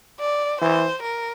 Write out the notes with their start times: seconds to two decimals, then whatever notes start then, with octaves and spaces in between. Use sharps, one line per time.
0.20 D5
0.61 E3 C5
1.03 A#4